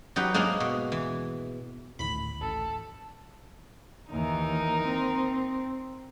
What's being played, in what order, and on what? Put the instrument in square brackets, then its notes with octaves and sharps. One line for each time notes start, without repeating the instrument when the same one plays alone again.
[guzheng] F#3 D#4 G4 B4
G#2 G#3 A#3 D4 A#4 F5
B2
E3
[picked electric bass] G#1 D2 [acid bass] A2 [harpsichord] B5
[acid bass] A1 [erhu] A4
[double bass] D#2 E3 [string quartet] D#4 A#4
[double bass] C4